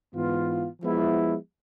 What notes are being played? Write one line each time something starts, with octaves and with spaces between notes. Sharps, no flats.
G#2 E3 B3 F4
F3 G#3 B3 E4